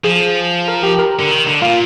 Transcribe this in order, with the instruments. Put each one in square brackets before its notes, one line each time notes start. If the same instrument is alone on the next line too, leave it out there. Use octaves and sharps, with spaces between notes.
[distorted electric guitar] F3 [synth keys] G#4
[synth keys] A#4
G4
A#4
[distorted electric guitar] D3
D#3
D3
[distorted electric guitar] A#2 [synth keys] F4